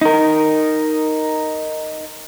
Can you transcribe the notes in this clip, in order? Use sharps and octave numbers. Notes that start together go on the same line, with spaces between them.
D#4 A#4